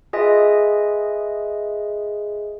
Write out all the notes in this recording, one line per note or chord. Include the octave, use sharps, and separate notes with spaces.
F4 G#4 B4 D#5 E5 G#5